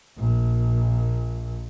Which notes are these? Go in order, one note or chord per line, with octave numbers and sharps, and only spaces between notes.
A#1 A#2